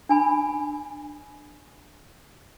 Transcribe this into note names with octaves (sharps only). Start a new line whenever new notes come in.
D4 G#5 B5